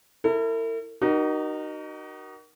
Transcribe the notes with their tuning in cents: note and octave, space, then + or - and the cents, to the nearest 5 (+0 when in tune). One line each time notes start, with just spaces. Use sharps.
E4 +0 A#4 -45
D#4 -20 F#4 +35 A#4 +20